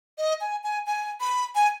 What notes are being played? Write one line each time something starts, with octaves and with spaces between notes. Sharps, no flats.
D#5
G#5
G#5
G#5
B5
G#5